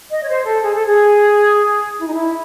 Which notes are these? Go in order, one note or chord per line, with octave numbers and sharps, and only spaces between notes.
D#5
C#5
C5
A4
G#4
A4
G#4
E4
D#4
E4